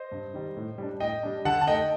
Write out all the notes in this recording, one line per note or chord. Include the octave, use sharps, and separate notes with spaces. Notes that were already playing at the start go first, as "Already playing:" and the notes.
Already playing: C5 D#5
G2
D#3 G3
A2
G3 D4
A2 D#5 G5
G3 D4
D3 F#5 A5
A5
A3 D#4 D#5 G5